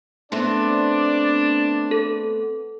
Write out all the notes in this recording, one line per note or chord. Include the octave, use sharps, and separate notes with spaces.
A3 B3 C4 D4 D5
A4